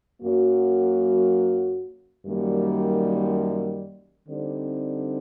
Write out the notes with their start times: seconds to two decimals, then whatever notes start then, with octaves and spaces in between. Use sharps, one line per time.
0.23 F#2 F#3 A#3 F#4
2.25 F#2 D#3 G3 A#3
4.27 D3 G3 C4 D#4